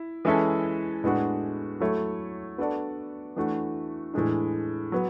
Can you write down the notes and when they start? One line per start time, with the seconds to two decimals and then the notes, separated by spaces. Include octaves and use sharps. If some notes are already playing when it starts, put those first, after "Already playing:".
Already playing: E4
0.25 E3 G#3 C#4 E4 A4
1.04 A2 G#3 B3 D4 F#4
1.80 F#3 A3 E4 A4 C#5
2.58 B3 D4 F#4 A4 D5
3.36 E3 A3 D4 F#4
4.14 A2 E3 G#3 D4
4.92 F#3 B3